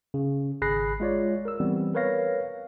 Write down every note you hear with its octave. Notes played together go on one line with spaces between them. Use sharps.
C#3
G#1 G#4 B5 F#6 A#6 C7
G#3 F4 C#5 D5
A#4 E6
E3 G3 B3 C4
A#4 B4 C#5 F5 A#6